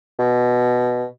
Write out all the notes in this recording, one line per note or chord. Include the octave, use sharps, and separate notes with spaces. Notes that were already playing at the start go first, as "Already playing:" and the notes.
B2